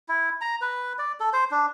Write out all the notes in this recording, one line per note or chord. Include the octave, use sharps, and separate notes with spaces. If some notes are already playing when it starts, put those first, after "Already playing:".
E4
A#5
B4
D5
A4
C5
D4